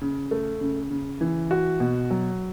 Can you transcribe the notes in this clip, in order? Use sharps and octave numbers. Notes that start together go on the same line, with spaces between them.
C#3
A3
C#3
C#3
E3
F#4
B2
F#3